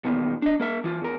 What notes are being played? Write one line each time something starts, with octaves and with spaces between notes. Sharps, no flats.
B1 E2 A#2 D#3 A#3 B3
D4 D#5
A#3 A#4 E5
E3 F4
E2 A#4